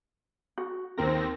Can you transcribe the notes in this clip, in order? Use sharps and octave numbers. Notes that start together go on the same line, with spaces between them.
F#4
D#2 C4 A#4 A#6